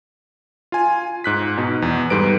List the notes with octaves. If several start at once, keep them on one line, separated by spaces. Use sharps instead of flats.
F4 G#5
G#2 F#6 B6
B2 D#4
E2
G#2 G3 A4 B4 D7